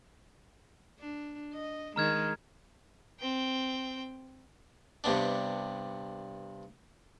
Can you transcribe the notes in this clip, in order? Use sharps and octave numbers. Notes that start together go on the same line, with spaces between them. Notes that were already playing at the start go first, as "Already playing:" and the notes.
D4
D#5
D#3 G#3 A#5 F6 G#6
C4 G5
G2 C3 B3 D4